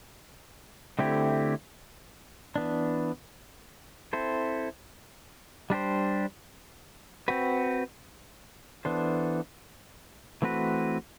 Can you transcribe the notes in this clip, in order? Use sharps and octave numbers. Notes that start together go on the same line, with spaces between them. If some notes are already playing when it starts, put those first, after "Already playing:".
D3 A3 C4 E4 G4
E3 B3 D4
C4 E4 A4 C5
G3 D4 G4 C5
C4 F#4 B4
E3 B3 D4 A4 C5
E3 A3 C4 F#4 B4